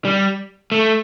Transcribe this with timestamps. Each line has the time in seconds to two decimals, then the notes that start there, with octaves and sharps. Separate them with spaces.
0.05 G3
0.72 A3